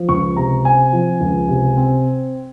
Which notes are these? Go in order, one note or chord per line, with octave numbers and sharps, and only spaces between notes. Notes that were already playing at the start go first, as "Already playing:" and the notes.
Already playing: F3
C#2 C#6
C3 A#5
C4 G#5
F3
C#2
C3
C4